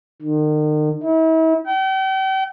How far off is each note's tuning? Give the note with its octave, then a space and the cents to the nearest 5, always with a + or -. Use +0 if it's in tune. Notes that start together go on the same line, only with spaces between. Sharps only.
D#3 -40
E4 -40
G5 -40